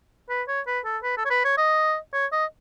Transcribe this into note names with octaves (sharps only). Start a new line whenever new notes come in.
B4
C#5
B4
A4
B4
A4
C#5
B4
C#5
D#5
C#5
D#5